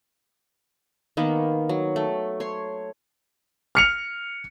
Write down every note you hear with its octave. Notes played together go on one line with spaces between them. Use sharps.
D#3 A#3 B3
F#3
A3
C#5 C6
F6 C#7 F7